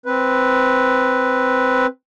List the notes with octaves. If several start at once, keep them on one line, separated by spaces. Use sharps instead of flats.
C4 B4